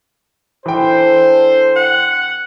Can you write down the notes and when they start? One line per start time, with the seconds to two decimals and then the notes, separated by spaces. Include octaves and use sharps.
0.66 E3 D4 A4 C5 G5
1.76 F#5